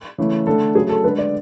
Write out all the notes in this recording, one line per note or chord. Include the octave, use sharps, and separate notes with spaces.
C#3 E3 A3
D3 A3 A4
C#3 F#3 A3 G#4
A4
D3 G#3 B4
D5